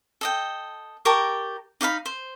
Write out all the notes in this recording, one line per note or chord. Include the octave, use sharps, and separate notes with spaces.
A4 D#5 G5
G4 A#4 A5 C#6
D#4 D5 F5 B5
C5